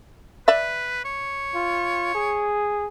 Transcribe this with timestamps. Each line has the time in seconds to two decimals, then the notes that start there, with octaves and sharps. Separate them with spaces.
0.48 B4 D5 E5
1.05 C#5
1.55 F4
2.15 G#4